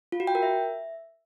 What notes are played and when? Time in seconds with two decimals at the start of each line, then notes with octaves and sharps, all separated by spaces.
0.12 F4
0.20 F#4
0.27 G5
0.35 A#4
0.43 E5